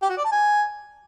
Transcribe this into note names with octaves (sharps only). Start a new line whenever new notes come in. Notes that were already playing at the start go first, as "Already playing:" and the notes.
G4
F#4
D5
A5
G#5